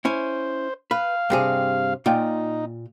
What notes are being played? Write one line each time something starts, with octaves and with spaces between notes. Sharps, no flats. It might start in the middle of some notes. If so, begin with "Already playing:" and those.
C#4 E4 C5
B4 F5
G2 C3 G#4
A#2 D#4 F4 G5